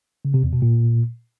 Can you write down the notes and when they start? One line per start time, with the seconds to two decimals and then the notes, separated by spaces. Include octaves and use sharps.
0.25 C#3
0.34 C3
0.43 E2
0.53 B2
0.62 A#2